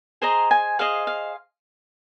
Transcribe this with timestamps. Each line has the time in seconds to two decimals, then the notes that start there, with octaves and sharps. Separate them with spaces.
0.22 G#4 C5 D#5 A#5
0.51 G#5
0.79 G#4 C5 D#5 F5
1.07 F5